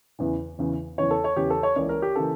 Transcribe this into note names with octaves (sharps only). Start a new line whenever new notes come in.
E2 C#3 E3
E2 C#3 E3
E2 C#3 E3 C#5
A4
C#5
E2 C#3 E3 G4
A4
C#5
C#2 C#3 E3 A#3 D5
A#4
G4
C#3 E3 A#3 A4